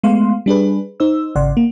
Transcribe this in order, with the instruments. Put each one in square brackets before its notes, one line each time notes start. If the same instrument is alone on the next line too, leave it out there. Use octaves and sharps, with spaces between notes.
[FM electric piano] G#3 A3 B3 F5 C6
G3 D4 G#4 B4
D#4 C5 E6
G#1 C#3 D5 F#5 C6
A#3